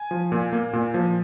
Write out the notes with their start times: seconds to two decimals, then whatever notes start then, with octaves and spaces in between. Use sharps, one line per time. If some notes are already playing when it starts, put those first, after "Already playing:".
Already playing: G#5
0.11 F3
0.32 A#2
0.53 A#3
0.73 A#2
0.94 F3